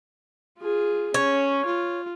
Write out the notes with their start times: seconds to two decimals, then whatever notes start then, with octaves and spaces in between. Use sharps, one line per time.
0.59 F4 G#4
1.14 C#4 C#5
1.66 F4